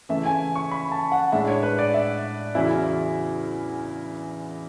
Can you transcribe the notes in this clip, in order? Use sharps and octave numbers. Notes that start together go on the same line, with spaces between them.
C#3 E3 A3 E5
G#5
C#6
B5
A5
F#5
A2 G#3 D4 E5
C#5
B4
D5
E5
E2 C#3 F#3 C#4 E4